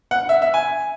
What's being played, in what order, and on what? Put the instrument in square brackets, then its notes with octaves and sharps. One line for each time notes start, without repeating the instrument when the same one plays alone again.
[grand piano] F#5
E5
E5
G#5